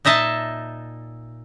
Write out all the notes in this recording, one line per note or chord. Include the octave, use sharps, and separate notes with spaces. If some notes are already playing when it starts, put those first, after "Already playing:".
A#2 D#4 D#5 E5 A5